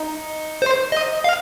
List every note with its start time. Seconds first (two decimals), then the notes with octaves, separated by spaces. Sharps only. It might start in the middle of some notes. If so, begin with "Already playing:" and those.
Already playing: D#4
0.62 C5
0.92 D#5
1.24 F5